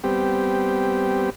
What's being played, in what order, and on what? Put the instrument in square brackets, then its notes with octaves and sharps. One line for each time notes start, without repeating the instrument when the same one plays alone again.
[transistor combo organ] G3 B3 C4 G4